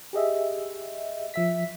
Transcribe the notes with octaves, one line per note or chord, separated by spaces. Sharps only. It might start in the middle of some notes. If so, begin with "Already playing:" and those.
G4 G#4 D#5 E5
F3 E5 B6